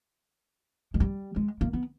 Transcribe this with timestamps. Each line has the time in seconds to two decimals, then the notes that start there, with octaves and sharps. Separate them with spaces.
0.94 G#3
1.00 G3
1.36 G#3
1.61 A#3
1.73 B3